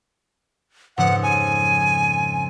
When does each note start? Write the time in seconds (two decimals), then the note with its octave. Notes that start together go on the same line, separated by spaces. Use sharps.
0.98 F2 G#2 C#3 F#5
1.23 G#5